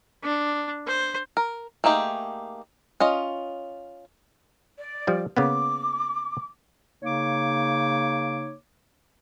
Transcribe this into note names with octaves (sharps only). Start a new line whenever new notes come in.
D4
C5
A#4
A3 A#3 D#4 G4 G#4
C#4 F4 D#5
D5
F3 G3
C#3 A#3 B3 D6
C#3 A#3 D#4 C#5 D6